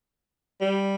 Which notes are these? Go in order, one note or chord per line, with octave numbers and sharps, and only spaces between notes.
G3